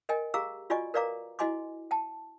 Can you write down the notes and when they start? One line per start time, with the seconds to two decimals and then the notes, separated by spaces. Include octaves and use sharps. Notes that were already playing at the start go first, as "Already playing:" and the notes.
0.09 A#4 D#5 G5 G#5
0.34 G4 G#4 F5 A#5 D6 E6
0.70 F4 F#4 D5 D#5 G#5 C#6
0.94 A#4 B4 D5 F5 A#5 D6
1.39 E4 F#4 D#5 G#5 C6 D6
1.91 G5 A5